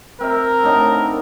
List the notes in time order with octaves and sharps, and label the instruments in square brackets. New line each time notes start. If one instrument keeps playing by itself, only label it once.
[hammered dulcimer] C4 E5 [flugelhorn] A#4
[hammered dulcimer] A2 D3 D#4